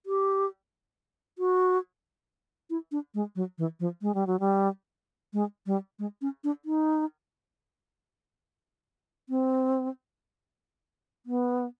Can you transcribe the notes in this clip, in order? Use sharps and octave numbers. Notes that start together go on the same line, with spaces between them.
G4
F#4
E4
D4
G#3
F#3
E3
F3
G#3
G3
F#3
G3
G#3
G3
G#3
C#4
D4
D#4
C4
B3